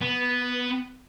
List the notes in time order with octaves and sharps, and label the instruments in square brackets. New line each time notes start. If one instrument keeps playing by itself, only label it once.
[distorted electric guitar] B3